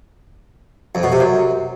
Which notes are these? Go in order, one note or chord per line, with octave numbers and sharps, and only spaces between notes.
F2
B2
C3
F#2